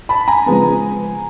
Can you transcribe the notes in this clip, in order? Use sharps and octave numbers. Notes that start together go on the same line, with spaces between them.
A5 B5
G#5 A#5
C#3 F3 G#3 B3